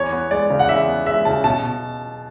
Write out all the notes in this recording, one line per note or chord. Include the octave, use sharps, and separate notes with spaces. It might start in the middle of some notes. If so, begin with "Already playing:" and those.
Already playing: E2 C#5
B3
G#3 D5
C#3
F#5
E2 E5
B3
G#3 E5
C#3 A5
B2 A5
B2